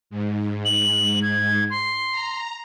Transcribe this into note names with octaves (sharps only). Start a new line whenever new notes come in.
G#2
F#7
G#6
C6
A#5